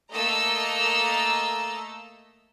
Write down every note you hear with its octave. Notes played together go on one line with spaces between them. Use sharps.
A3 A#3 A4 D#5 A#5 E6